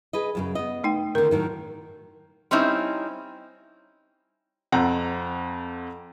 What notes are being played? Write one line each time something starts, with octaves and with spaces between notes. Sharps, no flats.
G#4 B4 D#5
F#2 A#2 C#3
B3 D#5
A3 D#4 G5
D3 D#3 A#4
A2 D#3 F#3
G3 C4 C#4 D#4 E4
F2 C4 F#5 A#5